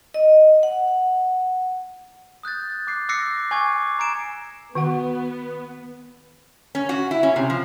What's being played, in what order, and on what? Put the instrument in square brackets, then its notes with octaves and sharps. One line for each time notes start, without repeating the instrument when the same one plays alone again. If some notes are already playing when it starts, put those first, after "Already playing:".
[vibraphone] D#5
F#5
[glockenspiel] D#6 F#6 G6 A6
D6 F#6 C7
D6 E6 F#6 A#6 C7 C#7
G#5 C#6 D6 G#6
A#5 G#6 D7 E7
[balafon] D#3 F#4 F#5 [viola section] B3
[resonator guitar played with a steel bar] C#4
F#4
E4
C#4
C3
F3